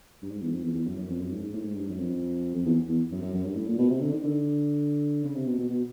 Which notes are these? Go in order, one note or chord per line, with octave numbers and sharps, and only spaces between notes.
G2
G#2
E2
F2
E2
E2
F#2
F#2
F2
F#2
G#2
G#2
A2
G#2
G2
F#2
F2
F2
E2
E2
F#2
F#2
F#2
G2
A2
A#2
B2
C3
D3
D#3
D3
C#3
C3
B2
B2
B2